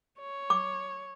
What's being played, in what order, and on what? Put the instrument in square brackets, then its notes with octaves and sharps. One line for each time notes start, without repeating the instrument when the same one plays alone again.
[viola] C#5
[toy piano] D6